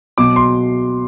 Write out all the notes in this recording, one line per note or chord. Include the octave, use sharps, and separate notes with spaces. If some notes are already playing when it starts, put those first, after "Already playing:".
B2 F#3 D6
C6